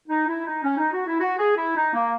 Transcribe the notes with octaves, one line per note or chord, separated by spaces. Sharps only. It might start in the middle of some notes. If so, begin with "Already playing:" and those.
D#4
E4
D#4
C#4
D#4
F#4
E4
F#4
G#4
E4
D#4
A#3